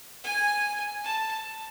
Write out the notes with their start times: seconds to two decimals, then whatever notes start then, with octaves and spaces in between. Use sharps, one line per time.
0.24 G#5
1.04 A5